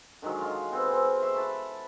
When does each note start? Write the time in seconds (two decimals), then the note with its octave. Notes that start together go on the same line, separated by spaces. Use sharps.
0.22 D3 D#3 F#3 G#3
0.41 G#3 F4
0.71 B3 C4 G#4
0.91 C4
1.22 E5 C6 C#6
1.36 F#5 A5 B5